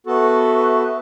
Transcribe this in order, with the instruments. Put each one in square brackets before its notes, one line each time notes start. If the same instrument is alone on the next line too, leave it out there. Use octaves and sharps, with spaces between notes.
[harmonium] B3 F#4 A4 [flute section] B4 E5 C#6